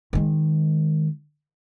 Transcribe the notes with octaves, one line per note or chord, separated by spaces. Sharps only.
D#3 G#3